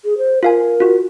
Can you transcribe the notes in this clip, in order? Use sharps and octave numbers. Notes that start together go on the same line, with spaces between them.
G#4
C5
F4 A#4 F5 G#5
F4 F#4